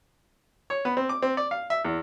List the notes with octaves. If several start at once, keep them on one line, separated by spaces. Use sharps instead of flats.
C#5
B3
C4
D6
C4
D5
F5
E5
E2